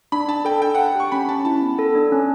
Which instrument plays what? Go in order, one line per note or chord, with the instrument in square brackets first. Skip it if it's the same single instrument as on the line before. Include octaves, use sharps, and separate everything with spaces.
[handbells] D4 [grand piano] B5
[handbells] D4 [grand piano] A5
[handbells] A4 [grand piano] G5
[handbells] D4 [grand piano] G5
[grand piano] F#5 [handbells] G5
[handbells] G4 [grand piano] C#6
[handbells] C#4 [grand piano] B5
[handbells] C#4 [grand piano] A5
[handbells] E4 [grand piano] A5
[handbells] B3
A4
D4
C#4